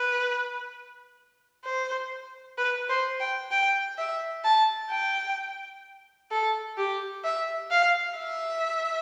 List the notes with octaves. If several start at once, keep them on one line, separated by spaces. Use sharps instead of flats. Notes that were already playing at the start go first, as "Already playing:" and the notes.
Already playing: B4
C5
B4
C5
G5
G5
E5
A5
G5
A4
G4
E5
F5
E5